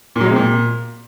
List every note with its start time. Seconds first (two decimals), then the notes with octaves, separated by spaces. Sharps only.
0.16 A#2
0.21 F#3
0.26 G#3
0.31 C3
0.36 A#2